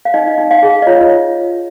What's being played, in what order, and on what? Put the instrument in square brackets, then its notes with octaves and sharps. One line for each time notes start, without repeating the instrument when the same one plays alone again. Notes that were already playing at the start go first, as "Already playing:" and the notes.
[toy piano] F5
D#4 D#5
D#4
F5
G#4
D#5
F4 C#5